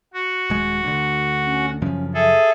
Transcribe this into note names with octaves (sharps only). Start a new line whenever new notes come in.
F#4
D#1 G#3
D2 D3
C#4
F#2 C#3 F3 C#4
G#4 A4 E5